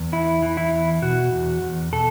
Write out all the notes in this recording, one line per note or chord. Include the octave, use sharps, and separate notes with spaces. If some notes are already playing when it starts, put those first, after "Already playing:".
Already playing: E2
E3 E4
E3
E4
E2
B2 F#4
E2
E2
B2 A4